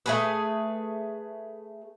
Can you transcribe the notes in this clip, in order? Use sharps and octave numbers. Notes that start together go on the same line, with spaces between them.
A3 G#4 B4